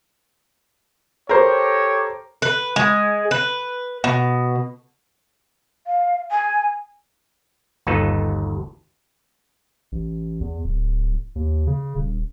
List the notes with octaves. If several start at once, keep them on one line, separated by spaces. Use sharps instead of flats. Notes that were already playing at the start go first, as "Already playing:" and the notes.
G4 A4 A#4 C5 C#5
B4
G#3
B4
B2
F5
G#5
G1 D#2 D#4 F4 A4 B4
A1
E2
D1
D#2
C#3
D#1